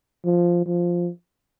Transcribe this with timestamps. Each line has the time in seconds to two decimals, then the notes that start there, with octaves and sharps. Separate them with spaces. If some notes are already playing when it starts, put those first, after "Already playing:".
0.25 F3
0.66 F3